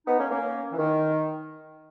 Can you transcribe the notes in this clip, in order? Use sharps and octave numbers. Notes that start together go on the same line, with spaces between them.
B3 D#4
A#3 C#4
A#3 C#4
E3
D#3